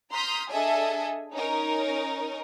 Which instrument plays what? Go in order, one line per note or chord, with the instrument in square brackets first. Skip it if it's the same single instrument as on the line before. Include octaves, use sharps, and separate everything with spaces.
[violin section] A#5 C6 D#6 F6 G6 B6
D4 G#4 A4 D#5 E5 G#5
C#4 D#4 A#4